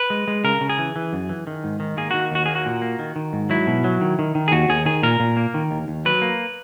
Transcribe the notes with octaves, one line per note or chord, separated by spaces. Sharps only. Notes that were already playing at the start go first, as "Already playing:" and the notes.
Already playing: B4
G#3
G#3
C#3 A#4
C#3
G#4
E3
E3
F#2
E3
D#3
G#2
D#3
A#3 G#4
D#3 F#4
D#2 F#4
A#3 G#4
F#4
A#2
A#3
D#3
D#3
G#2
F#3 E4
B2
F#3
D#3
D#3
D#3
G#4
D#2 F#4
D#2 G#4
D#3 G#4
A#2 A#4
A#2
A#3
D#3
D#2
D#2
F#3 B4
A#3